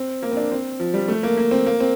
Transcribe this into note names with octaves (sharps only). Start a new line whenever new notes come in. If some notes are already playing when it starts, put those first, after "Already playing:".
Already playing: C4
A#3
C4
D4
C4
F3
G3
A3
A#3
A#3
C4
A#3
C4